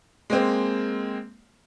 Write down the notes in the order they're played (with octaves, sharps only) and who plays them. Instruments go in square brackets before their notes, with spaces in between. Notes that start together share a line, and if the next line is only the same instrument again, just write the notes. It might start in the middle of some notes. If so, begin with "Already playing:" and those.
[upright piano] G#3 A#3 C4